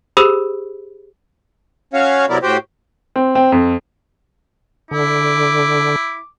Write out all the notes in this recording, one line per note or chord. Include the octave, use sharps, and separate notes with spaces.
G4 G#4 C5 B5 D#6 E6
C#4 F#4 C#5 F5
C3 F#3 B3 E4 A#4 D5
A2 F#4 G4 C5 G5
C4
C4
F2
D3 E4 D6